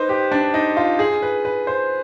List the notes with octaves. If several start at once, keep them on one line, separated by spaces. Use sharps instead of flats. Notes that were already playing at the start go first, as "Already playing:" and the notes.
Already playing: D#4 B4 C5
G4
D4
D#4
F4
G#4
B4
B4
C5